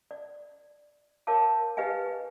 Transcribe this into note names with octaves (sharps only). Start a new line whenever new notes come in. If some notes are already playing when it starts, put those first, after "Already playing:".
D5
A#4 C#5 F5 A5 D6
G4 B4 D#5 F5 G#5